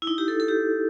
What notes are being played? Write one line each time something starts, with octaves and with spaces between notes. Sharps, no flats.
E4
D#4
G4
A4
A4
G4